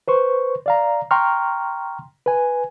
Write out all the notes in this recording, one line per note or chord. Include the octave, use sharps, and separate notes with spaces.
B4 C5 C#6
D5 F5 A#5
G5 A#5 C6 C#6 F6
B4 G#5